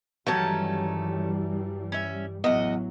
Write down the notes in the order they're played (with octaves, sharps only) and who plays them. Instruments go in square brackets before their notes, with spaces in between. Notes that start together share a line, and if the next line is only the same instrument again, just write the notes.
[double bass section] G2 E3 G3 [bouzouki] D#3 A3 C#4 [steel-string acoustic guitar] F#3 A5
[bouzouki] C#4 E5
[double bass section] A1 F#3 [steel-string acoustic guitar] E2 [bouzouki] F#4 D#5